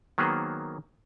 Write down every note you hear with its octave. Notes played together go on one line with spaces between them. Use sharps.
D#3 F#3 A#3 B3 G#4 C5